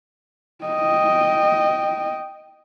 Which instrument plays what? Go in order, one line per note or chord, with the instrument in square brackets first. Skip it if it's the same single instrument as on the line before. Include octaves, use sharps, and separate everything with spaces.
[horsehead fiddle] D#5 G5